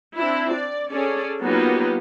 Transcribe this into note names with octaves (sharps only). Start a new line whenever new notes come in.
C4 D4 E4
D5
C#4 G#4 A4 D5
F#3 A#3 B3 D#4 F4 G4